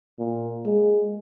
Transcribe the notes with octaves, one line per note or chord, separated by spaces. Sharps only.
A#2
G#3